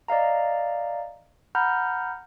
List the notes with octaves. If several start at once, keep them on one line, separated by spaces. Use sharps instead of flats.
D5 D#5 F5 A#5
F#5 A#5 B5 F6 G6